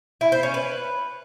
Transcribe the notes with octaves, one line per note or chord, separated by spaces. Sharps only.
E4
C5
C#4
B4